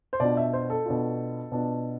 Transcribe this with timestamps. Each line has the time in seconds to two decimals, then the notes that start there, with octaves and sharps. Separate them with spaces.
0.13 C5
0.20 B2 B3 D4 F4 D5
0.37 E5
0.53 C5
0.70 A4
0.86 B2 B3 D4 F4
1.52 B2 B3 D4 F4